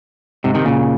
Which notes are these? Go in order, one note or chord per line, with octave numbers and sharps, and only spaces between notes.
G#2 C3
C3 D#3
A#2 C#3